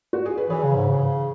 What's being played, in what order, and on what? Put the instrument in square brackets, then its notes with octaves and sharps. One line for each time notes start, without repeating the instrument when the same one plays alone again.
[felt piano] F#4
G#4
B4
[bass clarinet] E3 [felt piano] G#4 C#5
[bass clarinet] C#3
G#2
C#3